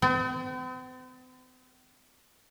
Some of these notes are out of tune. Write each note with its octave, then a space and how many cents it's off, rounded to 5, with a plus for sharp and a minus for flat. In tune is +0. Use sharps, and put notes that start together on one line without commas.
C4 -45